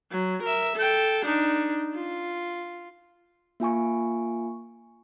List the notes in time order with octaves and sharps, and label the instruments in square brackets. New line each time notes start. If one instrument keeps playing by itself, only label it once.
[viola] F#3
A#4 E5
A4 G5
D4 D#4
F4
[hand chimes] A#3 F4 G#5 C#6